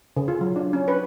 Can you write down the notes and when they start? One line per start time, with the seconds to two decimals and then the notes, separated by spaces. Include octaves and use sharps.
0.16 C#3
0.28 F4
0.41 F#3
0.56 D4
0.73 C#4
0.88 B4